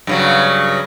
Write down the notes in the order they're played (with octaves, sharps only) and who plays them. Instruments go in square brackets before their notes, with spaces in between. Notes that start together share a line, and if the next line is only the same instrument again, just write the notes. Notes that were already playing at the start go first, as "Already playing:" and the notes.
[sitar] G2 C#3 F#3